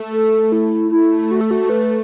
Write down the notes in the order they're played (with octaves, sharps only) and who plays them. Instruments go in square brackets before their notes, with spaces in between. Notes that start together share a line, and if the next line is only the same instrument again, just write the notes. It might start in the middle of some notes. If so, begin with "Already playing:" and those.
Already playing: [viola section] A3
[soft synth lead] A4
E4
[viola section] A3 [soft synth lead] E4
[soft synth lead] F#4
A4
F#4
B4